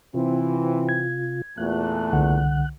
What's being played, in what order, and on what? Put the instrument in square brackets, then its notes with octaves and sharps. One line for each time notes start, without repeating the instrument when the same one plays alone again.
[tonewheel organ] C3 F4 [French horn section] E3 C4
[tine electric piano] G#6
[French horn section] E2 A#2 A3 [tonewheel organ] F#6
[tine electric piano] C2 D3 F#5